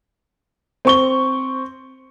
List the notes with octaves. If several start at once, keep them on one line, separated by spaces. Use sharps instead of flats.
C4 C#6 G7